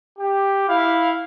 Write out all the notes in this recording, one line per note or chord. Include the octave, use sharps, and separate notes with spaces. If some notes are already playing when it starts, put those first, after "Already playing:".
G4
E4 F5